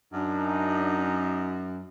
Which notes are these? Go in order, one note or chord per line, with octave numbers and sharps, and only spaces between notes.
F#2 D4 D#4